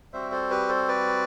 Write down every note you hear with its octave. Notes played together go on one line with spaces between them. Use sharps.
G3 C4 F#4 C5 E5
A4 C5
G4 B4
A4 C5
B4 D5